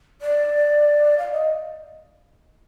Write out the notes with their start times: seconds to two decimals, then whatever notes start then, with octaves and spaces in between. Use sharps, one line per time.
0.22 D5
1.18 F5
1.32 D#5